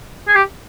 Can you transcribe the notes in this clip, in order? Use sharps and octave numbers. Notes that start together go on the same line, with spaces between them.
G#4
G4